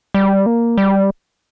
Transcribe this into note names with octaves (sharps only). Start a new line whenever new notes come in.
G3
A#3
G3